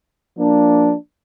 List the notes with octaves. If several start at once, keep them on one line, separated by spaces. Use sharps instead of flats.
F3 A#3 D4